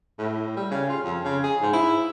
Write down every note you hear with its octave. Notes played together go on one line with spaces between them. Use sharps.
A2
G3
C#3
F4
F2
C#3
G#4
G#2
E4